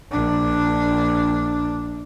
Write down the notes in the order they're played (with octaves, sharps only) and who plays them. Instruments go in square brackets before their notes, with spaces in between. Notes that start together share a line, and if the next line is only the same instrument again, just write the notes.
[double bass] A#1 D4